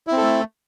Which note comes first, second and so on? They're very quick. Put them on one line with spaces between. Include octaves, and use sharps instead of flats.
E4 C4 A4 A3